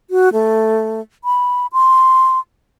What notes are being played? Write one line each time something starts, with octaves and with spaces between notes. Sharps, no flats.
F#4
A3
B5
C6